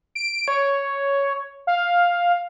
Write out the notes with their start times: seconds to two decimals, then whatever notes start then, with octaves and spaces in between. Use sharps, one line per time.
0.15 D7
0.48 C#5
1.67 F5